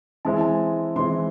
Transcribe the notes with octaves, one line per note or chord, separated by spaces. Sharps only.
E3 G#3 C4 E4 A5
G#5
A5
E3 G#3 C4 E4 C6